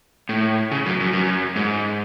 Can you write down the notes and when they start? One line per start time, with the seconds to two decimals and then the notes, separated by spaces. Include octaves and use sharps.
0.29 A2
0.71 C#3
0.86 F#2
1.00 F#2
1.13 F#2
1.56 G#2